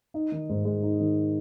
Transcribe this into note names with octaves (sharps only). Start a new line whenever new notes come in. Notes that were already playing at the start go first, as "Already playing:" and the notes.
D#4
D#3
G#2
G#3
D#4
D#3